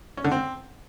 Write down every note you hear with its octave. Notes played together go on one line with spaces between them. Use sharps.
C#4
D3
C4